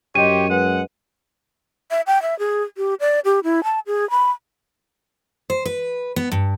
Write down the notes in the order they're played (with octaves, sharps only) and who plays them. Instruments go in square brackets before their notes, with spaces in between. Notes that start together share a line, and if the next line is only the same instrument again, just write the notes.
[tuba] F#2 [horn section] G4 C5 C#5 [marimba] D#5 G5 [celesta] D#7
[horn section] G#3 F#5 [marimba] B4
[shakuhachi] E5
G5
E5
G#4
G4
D5
G4
E4
A5
G#4
B5
[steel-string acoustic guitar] C5
B4
B3
G2